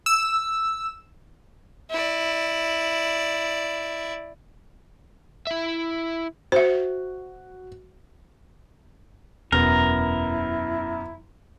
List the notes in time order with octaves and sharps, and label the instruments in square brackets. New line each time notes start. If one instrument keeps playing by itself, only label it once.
[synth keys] E6
[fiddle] E4 D5
[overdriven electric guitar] E4 E5
[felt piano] F#4 [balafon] C5 E5
[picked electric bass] E1 [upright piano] F#2 B3 [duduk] E4 [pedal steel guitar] A#4